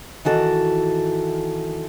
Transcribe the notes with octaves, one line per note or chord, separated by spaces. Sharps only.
D#3 E3 F#4 A4